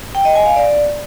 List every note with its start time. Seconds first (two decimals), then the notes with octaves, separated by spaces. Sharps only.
0.15 G5
0.25 D#5
0.35 G#5
0.46 F5
0.56 D5